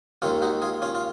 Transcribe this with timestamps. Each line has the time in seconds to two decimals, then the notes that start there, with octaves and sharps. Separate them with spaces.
0.22 D#2 D#3 G#3 C#4 F4
0.42 D#4 F#4
0.62 F4 G#4
0.82 C#4 F4
0.95 F4